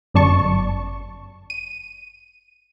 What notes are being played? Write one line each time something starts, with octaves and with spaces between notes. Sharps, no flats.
G1 F#2 D5 A5 C#6
D#7